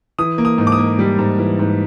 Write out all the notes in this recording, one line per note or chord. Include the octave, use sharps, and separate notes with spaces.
E3 D#6
A#3
D#6
G#2
D6
D#6
A#3
G3
G#2
E3
G#2